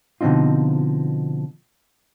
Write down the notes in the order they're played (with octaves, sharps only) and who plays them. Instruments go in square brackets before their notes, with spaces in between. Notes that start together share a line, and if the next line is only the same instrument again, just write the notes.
[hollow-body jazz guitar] B2 D3 F3 C4 D#4 F4